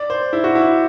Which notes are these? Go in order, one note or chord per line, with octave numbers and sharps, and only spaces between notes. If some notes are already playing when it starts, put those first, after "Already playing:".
Already playing: D5
C5
E4
F#4
E4